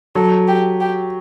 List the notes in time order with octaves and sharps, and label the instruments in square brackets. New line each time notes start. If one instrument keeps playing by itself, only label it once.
[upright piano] F#3 [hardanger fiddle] A4
[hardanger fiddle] G4
G4